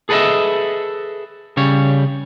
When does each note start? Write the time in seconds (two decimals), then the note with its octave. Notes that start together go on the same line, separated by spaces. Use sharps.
0.09 G#4 A4 B4 C5 D#5 E5
1.57 C#3 G3 C#5